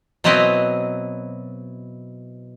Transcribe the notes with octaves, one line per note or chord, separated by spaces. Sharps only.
B2 F#3 B3 C4 E4 D#5